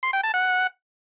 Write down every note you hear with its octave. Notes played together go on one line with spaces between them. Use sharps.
C6
G5
A5
F#5